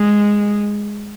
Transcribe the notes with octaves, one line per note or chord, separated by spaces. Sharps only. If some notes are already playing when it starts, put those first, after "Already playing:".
Already playing: G#3